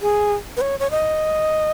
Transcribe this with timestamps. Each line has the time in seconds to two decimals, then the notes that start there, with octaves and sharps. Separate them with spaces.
0.02 G#4
0.57 B4
0.61 C#5
0.80 C#5
0.91 D#5